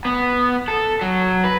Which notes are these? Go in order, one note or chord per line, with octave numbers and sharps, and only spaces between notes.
B3
A4
F#3
B4